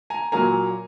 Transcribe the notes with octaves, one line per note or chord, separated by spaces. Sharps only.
G#5 A#5
A#2 F#3 A#3 G#5 A#5